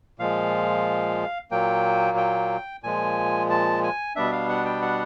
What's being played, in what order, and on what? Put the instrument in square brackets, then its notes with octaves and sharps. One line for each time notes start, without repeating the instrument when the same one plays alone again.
[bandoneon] A#2 F3 G#3 F5
A#2 F#3 A#3 G5
G5
A#2 F3 G#3 G#5
A5
G#5
B2 G3 B3 D4 E5
F5
F#5
G5
F#5